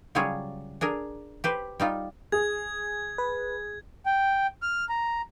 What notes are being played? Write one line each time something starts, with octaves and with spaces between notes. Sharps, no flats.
C#3 F#3 G3 F4 G#4 C#5
D4 G#4 A#4
G4 B4 C5
G3 D#4 F4
G#4 G#6
B4
G5
F6
A#5